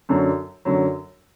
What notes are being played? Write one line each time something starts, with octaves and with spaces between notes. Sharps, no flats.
F#2 D3 F#3
F#2 D3 F#3